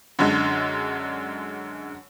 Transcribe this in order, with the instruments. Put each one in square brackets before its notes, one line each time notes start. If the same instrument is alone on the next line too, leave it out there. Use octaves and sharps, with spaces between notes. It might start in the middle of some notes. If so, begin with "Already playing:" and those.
[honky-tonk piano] F#2 D3 G#3